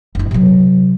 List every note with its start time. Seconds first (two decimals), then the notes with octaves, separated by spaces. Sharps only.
0.15 F#1 E4
0.31 C3 F#3